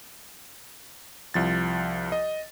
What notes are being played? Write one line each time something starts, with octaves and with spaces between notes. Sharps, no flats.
C2 F3 A6
D#5